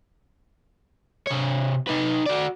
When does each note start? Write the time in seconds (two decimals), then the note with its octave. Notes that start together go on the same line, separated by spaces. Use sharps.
1.27 C3 C#5
1.87 D#4 B4
2.26 F#4 D5